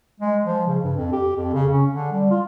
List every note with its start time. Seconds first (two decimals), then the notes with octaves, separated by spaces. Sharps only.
0.20 G#3
0.44 F3
0.67 C#3
0.84 G2
0.97 F2
1.13 G4
1.36 F2
1.54 C#3
1.73 C#4
1.92 D3
2.12 G3
2.31 F4